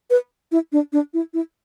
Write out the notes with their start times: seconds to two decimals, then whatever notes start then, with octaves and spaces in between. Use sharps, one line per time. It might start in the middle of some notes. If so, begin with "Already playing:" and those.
0.10 B4
0.52 E4
0.72 D4
0.93 D4
1.14 E4
1.34 E4